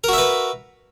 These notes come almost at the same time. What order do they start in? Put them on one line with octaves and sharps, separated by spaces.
A#4 F#4 E5 B4